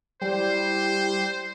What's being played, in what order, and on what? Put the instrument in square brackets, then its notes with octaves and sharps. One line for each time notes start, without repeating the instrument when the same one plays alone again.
[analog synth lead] G3 [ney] E4 [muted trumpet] C5